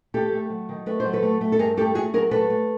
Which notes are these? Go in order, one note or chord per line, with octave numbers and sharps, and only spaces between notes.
A3 G4 A4
A3
F#3
D#3
A3 B4
C5
F#3
A4 B4
A3
A3
A4
G2 G#4 A#4
A3 G4 A4
A3 F#4 G#4
F#3 G#4 A#4
A3 A4 B4
A3